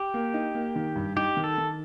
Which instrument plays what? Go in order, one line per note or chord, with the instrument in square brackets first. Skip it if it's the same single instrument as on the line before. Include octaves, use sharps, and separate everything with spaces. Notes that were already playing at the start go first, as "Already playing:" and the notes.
Already playing: [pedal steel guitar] G4
[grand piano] A#3
D#4
A#3
D#3
G2
[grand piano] D#4 [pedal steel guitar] G4
[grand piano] D#3
[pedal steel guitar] A4
[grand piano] D#3